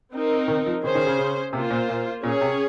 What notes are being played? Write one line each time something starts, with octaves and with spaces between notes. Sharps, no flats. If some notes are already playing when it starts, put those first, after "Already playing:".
C4 D#4 A#4
D#3
F3
D#3 C#4 G#4 C5
D#3
C#3
C#3
C3 A#3 F4 C5
A#2
A#2
A#2 C#4 G#4 C#5
C3